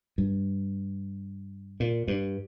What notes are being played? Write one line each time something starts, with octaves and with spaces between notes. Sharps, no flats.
G2
A#2
G2